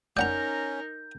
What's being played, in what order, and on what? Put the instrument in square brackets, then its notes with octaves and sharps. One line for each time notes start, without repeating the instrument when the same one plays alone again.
[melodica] C#4 [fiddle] D#4 A#4 [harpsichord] D5 F#5 A#5 [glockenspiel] G6